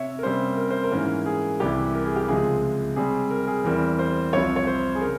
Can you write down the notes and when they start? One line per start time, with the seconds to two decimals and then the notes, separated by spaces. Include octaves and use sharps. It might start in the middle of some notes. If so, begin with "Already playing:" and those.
Already playing: C3 C#5 E5
0.19 A#4
0.23 C3 G3 A#3 C#4 C5
0.57 A#4
0.71 C5
0.84 A#4
0.91 G#2 E3 A#3 C#4
1.26 G#4
1.60 C2 C3 E3 G4
1.94 A#4
2.06 G#4
2.16 G4
2.28 C#2 C3 F3 G#3 G#4
2.96 C3 G3 C4 G#4
3.31 A#4
3.47 G#4
3.64 E2 E3 G3 C4 A#4
3.99 C5
4.33 C2 C3 F3 C4 C#5
4.56 C#5
4.67 C5
4.95 G#4
5.01 C#3 A#4